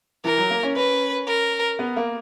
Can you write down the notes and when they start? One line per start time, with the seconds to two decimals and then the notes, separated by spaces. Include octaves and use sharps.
0.24 E3 A#4
0.37 F#3
0.50 A#3
0.63 C#4
0.76 C#4 B4
1.27 A#4
1.79 B3
1.96 A#3